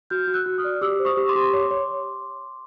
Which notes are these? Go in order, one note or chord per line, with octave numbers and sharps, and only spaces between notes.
F#4 F6 G6
F#4
E6 F#6
F#4
D#6 F6
D5
G4 D6 E6
C5
C#6 D#6
G4
C6 D6
G4
C#5
C#5